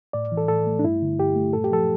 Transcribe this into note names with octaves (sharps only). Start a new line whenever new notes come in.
A2 D5
E3
A4
A2 A4
A3
D4
G2 E4
D3
G2 G4
A3
A#2 A4
G4
F3 A4